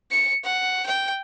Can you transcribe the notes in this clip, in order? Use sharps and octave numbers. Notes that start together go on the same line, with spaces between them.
C#7
F#5
G5